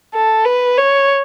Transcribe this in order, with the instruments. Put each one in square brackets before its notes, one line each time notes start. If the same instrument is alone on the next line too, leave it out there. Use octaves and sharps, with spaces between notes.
[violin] A4
B4
C#5